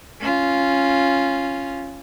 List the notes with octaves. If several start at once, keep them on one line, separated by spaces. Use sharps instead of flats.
C#4 F4